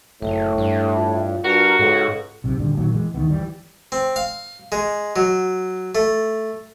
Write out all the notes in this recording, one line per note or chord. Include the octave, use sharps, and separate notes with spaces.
F#1 A2
G2
F4
G2 F#4 A#4
C#2 G#2 A4
B1 C3
D#1 D3 G3
A#2 D#3 F#3 A#3
E3 G#3
D2 D#3 E3 B3
E3 F3 G3
C4
F5
G#3
F#3
A3